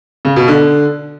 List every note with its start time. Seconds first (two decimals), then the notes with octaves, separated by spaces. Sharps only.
0.25 C#3
0.36 B2
0.48 D3